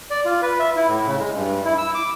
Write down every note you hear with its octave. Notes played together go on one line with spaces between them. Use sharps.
D5
F4
B4
E5
E4
A2
C#3
G#3
G2
E4
E6
D6